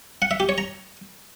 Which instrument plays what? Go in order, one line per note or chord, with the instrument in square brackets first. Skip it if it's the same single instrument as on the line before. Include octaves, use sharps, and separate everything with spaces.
[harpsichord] F#5
E5
G4
C#5
A#5